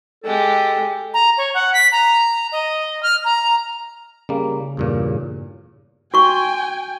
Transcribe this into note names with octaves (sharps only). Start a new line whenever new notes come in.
G#3 G4 A4
A#5
C#5
F#5
B6
A#5
D#5
F6
A#5
C#3 G3 A#3
E2 G2 A#2
F#4 G5 G#5 C#6